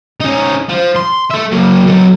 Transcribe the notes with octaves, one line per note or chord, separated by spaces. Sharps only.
C#4 D#4
F3
C6
A4 E5
F#3 A#3
F#3 A4